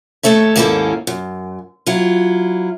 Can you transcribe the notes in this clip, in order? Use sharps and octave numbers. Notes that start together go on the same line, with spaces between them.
D#2 A3 A4 C#5 E5
D#2 G#2 A#3 C#4 E4 A4
F#2
F#3 E4 F4